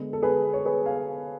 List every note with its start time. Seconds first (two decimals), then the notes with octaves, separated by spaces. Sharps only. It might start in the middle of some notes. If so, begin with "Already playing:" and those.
Already playing: D3 G#3 B3
0.13 A4
0.23 G#4 B4
0.54 C#5
0.65 G#4 B4
0.86 F5 G#5